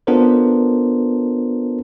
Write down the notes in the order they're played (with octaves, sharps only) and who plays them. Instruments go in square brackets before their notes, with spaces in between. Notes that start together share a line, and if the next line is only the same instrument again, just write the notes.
[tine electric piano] B3 D4 F4 A4 A#4 C5